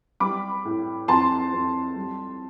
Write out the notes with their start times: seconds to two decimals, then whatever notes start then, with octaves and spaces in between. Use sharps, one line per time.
0.20 G3 B5 D6
0.65 A2
1.08 F2 A5 C6
1.53 F2
1.96 G3